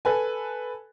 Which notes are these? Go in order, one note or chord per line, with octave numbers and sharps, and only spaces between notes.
A4 B4 G#5